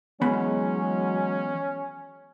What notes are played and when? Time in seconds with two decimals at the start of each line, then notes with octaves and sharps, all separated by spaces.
0.22 E3 F#3 G#3 B3 C#4 B5